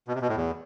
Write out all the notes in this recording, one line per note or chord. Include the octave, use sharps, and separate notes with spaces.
B2
C3
B2
A2
E2